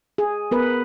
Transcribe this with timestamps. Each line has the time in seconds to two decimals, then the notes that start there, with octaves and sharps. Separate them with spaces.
0.18 G#4
0.51 B3 A#4 B4